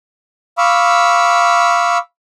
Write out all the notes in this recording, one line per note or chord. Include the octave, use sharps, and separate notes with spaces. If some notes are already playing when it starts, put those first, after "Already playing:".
F5 B5 C#6 D6 E6